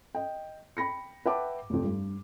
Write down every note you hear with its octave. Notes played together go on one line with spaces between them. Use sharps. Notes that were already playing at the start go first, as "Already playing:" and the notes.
D#5 G5
G5 B5 A#6 C#7
B4 E5 F#5 G5 A5 D6
F1 F2
G2